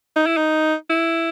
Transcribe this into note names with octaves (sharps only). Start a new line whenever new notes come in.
D#4
E4
D#4
E4